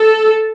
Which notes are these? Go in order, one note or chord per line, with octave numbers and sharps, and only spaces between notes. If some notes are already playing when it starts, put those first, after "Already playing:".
Already playing: A4